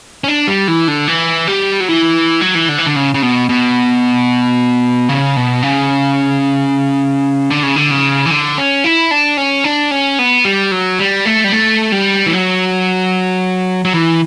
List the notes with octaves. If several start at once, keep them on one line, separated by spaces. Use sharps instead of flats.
C#4
D4
G3
E3
D3
E3
G3
F#3
E3
F#3
E3
D3
E3
D3
C#3
C#3
B2
B2
C#3
B2
C#3
D3
C#3
D3
C#3
E3
D3
C#4
E4
D4
C#4
D4
C#4
B3
G3
F#3
G3
A3
G3
A3
G3
E3
F#3
F#3
E3